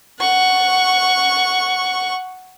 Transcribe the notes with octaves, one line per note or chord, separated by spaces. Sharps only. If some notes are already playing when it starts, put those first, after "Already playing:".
F#5 C#6